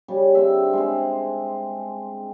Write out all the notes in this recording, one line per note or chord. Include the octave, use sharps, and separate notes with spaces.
C#3 G3
D3 C4 E5
G#3 C4